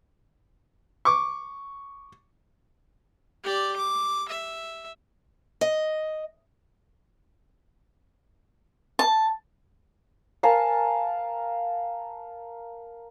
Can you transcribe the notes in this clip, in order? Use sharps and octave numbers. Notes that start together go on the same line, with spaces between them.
C#6 D6
G4 D5
D6
E5
D#5
A5
A#4 F5 G#5 A5